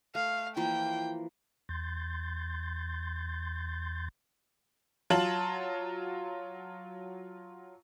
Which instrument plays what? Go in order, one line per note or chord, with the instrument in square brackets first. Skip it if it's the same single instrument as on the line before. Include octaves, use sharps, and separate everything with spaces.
[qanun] A3 [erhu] F5
[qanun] E3 F3 A#3 [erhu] G5
[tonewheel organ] E2 C6 G6 A6
[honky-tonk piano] F#3 F4 A5 F#7